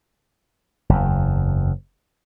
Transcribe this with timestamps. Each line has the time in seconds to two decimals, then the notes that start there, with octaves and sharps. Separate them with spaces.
0.89 F#1 E2